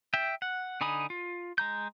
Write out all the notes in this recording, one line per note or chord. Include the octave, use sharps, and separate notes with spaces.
E5 G5
F#5
D3 D#4 G#5 B5 D#6
F4
G#3 A#5 G6